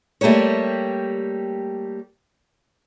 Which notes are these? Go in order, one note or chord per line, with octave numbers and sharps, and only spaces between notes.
G3 A3 A#3 G4 C#5